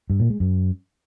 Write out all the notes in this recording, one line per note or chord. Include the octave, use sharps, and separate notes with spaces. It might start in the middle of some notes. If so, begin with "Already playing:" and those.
G2
A#2
G#3
F#2